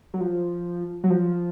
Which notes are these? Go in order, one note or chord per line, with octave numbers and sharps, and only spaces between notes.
F#3
F3
F#3
F3